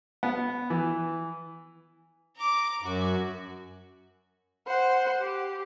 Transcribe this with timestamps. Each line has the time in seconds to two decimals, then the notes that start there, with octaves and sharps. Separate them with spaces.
0.23 B3
0.70 E3
2.36 A#5 D6
2.83 F#2 F#4
4.67 C5 F#5
5.21 G4